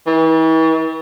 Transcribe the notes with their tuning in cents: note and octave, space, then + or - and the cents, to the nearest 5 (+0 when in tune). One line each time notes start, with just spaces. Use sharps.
E3 -40